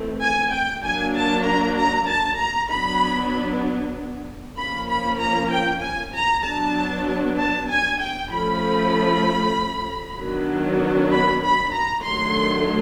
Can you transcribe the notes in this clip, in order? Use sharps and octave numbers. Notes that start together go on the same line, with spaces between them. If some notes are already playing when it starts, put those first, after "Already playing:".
Already playing: E3 A3 C4
G#5
G5
F#3 A#3 D4 G#5
A5
A#5
A#5
A5
A#5
F#3 B3 D4 B5
F3 A#3 C#4 B5
B5
A#5
G5
G#5
A#5
F#3 B3 D4 A5
A5
G#5
G5
F3 A3 C#4 B5
D#3 F#3 B3 D4
B5
B5
A#5
D#3 F#3 A3 D4 C6